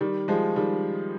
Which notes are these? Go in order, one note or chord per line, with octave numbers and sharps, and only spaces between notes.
D#3 G3
F3 G#3
D#3 G3